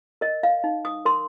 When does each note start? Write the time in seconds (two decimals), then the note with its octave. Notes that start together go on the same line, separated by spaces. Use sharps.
0.21 A#4 D#5
0.43 F5
0.64 D#4
0.85 D#6
1.05 A#4 C6